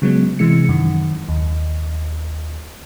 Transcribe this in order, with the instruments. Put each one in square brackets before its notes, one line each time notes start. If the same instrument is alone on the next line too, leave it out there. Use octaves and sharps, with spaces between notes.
[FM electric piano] C#3 F#3 G#3 B3
C3 E3 G#3 C#7
F#2 D#3
D#2